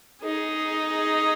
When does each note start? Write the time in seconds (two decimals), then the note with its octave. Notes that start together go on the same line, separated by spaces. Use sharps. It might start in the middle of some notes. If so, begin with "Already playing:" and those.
0.24 D#4 G#4